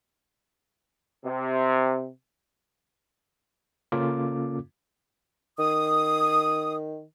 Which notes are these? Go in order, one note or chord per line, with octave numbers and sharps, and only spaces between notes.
C3
C#3 A#3 C#4 F4 A4 D6
D#3 D#6